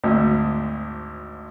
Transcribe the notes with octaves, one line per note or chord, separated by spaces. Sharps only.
G#1 D2